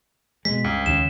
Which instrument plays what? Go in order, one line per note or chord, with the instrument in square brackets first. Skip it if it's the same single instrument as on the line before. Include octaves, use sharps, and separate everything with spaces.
[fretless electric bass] B2 G#3 [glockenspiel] B6
[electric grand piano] C#2 [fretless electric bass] G2
[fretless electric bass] D#2 C#3 [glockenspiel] E7